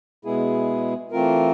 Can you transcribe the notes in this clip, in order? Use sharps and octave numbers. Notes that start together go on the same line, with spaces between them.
B2 G#3 B3 E4 G#4
E3 A3 C4 F4 A#4